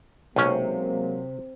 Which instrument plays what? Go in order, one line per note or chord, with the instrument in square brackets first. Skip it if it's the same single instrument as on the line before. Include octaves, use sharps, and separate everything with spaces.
[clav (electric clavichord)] B1 C#4 [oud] C3 [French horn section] F#3 G#3 A#3